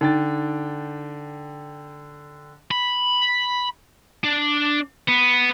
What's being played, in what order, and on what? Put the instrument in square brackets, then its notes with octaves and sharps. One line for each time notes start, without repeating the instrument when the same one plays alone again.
[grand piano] D3 G5 A6 [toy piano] D#4
[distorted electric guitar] B5
D4
B3